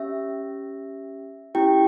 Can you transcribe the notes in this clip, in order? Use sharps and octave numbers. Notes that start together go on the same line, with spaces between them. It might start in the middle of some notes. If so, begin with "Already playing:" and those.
Already playing: C#4 G4 E5
C#4 E4 G4 G5